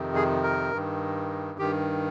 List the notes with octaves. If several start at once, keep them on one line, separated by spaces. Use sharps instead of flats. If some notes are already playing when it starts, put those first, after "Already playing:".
Already playing: F2 C3 D#3
G#4
A#4
G2 D#3
G2 D#3 G4